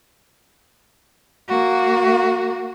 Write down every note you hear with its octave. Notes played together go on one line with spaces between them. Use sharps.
A#3 F#4